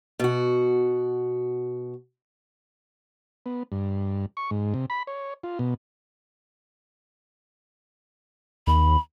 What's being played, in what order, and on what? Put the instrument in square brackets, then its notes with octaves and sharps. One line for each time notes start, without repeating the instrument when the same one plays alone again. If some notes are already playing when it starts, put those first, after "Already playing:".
[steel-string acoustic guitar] B2 F#4
[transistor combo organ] B3
G2
C#6
G#2
C3
B5
C#5
F4
B2
[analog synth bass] D#2 [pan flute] B5